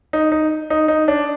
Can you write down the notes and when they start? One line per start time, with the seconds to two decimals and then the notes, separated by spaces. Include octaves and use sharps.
0.13 D#4
0.32 D#4
0.70 D#4
0.88 D#4
1.08 D4